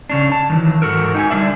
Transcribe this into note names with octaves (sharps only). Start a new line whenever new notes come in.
C#3 C#4 D4
A5
D#3 E3 F#3
G#2 F#4 A4 A#4
D#4 G5 G#5
D3 G3 B3 D4 D5 E5